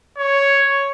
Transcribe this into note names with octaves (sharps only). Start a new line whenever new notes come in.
C#5